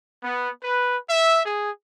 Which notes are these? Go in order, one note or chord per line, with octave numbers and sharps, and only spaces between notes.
B3
B4
E5
G#4